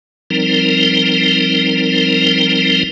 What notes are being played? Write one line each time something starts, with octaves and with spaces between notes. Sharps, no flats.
F3 G3 C4 D#4 A#4